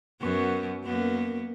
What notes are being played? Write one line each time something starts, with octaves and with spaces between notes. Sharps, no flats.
F#2 B3
F#2 A#3 B3